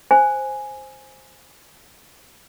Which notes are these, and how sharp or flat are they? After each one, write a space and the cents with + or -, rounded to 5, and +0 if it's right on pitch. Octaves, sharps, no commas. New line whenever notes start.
C5 +0 G#5 +0